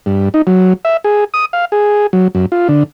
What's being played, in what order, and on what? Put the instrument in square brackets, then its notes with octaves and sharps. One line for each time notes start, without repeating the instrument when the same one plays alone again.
[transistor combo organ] G2
D#4
F#3
E5
G#4
D#6
F5
G#4
F#3
F#2
F4
D3